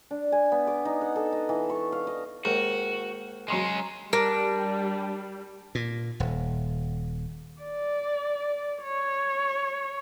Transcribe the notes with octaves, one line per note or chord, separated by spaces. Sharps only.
D4
G#5
B3
D6
D#4
F#5
A4
D#5
E3
C#6
F5
D#5
D#2 G#2 F#4
F#3 G#3 C#4 C6 D#7
G3 D4 A#4
A#2
D#1
D5
C#5